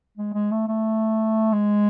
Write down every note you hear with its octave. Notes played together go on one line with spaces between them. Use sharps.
G#3
G#3
A3
A3
G#3